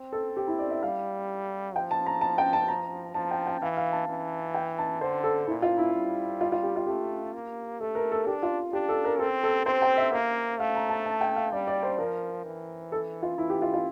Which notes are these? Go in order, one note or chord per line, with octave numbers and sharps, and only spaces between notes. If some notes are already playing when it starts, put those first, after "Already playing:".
Already playing: C4
A4
G4
E4
D5
E5
G3 F5
F3 G5
A5
A#5
A5
G5
A5
A#5
F3 A5
G5
G5
E3 F5
F5
A5
E3
G5
A5
D3 C5
A4
A#2 E4
F4
E4
G3
F4
F4
G4
F4
A3 G4
A#3
A3 A4
A#4
A4
D4 G4
F4
D4 G4
A4
A#4
C4 A4
A4
C4 C5
G5
E5
A#3 F5
A3 F5
A#5
A5
A5
G5
F5
G3 D5
D5
C5
F3 A#4
E3
A4
F4
E3 E4
G4
F4
F4